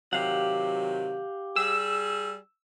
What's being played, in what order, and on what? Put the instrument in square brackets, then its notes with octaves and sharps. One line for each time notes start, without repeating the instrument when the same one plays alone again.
[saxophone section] C3 D#3 F#3 [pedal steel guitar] G4 F5 F#5
[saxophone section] G3 G#4 [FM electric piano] E6